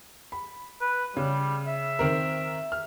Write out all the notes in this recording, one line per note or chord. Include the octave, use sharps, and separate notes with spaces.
B5
B4
C#3 G3
E5
D#3 C4 A#4
F6